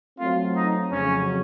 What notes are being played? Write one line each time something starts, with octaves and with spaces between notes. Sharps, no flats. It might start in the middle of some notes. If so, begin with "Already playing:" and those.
F#3 A3 C4 F4
D#4
F2 C#3 F#3 C#4